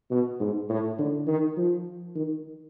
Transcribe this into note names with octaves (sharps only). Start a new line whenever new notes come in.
B2
G#2
A2
D3
D#3
F3
D#3